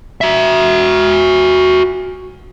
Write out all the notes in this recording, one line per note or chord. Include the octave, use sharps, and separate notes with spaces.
F#4 E5